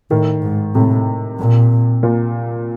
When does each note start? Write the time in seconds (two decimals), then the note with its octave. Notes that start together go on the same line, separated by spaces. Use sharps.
0.11 A2 D#3
0.42 G#2
0.75 A2 C3
1.39 A#2
2.03 A#2